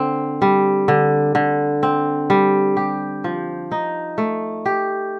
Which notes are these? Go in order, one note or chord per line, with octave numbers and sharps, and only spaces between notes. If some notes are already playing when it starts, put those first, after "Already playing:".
Already playing: D3 C4
G3
D3
D3
C4
G3
G4
F3
D#4
A3
G4